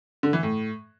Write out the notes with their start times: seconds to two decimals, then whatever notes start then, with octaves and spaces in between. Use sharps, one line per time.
0.23 D3
0.33 E3
0.43 A2